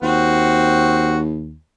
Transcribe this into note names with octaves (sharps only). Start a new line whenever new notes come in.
D#2 C4 F#4